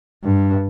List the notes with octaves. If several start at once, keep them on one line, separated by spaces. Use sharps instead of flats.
G2